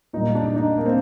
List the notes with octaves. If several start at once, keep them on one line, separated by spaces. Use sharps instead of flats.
A#2 G3 D#4
D4
D#4
A#3
C4